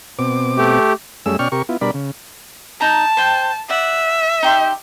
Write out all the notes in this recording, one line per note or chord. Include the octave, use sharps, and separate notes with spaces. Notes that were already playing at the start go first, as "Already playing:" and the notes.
B2 C4 D6
A3 G4
F#2 G3 A3 C#4 G#4 E6
B2 C#4 D5 G5 C#6 F6
C3 G4 A#4 C#6
B3 E4 F4
B2 G3 D4 A#4 D5 B5
C#3
D#4 A5 A#5
C5 G5
D5 E5 F#5
D#4 G4 C6